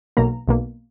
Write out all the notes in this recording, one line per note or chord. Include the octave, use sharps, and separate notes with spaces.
B1 B2 A#3 A#5
B1 B2 A#3